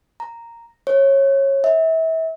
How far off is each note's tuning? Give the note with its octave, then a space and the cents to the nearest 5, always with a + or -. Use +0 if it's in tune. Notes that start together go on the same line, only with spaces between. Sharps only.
A#5 -5
C#5 -20
E5 -30